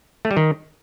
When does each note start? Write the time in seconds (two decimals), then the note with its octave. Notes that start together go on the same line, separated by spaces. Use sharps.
0.25 A3
0.31 G3
0.37 D#3